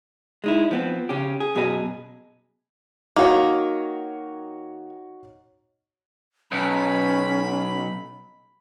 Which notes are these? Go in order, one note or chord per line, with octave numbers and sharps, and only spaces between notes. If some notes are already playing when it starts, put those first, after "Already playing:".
G#3 D#4 E4
F3 B3 C4
C#3 C#4 G4
G#4
F#2 B2 G#4 B4 D#5 G#5
D#3 A#3 D#4 F#4 C#5
B1 C#4 B5